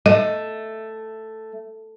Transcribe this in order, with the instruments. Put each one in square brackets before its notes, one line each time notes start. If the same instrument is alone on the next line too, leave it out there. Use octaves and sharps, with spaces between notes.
[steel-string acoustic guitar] A3 [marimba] D#5